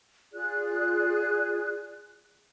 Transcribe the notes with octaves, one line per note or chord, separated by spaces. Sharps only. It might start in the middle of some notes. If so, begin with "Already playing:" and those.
F4 G#4 D5 F#6